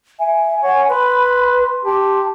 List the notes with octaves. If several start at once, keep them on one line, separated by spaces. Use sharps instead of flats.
E5 G#5
C#5 F#5
B4 B5 C6
G4 A5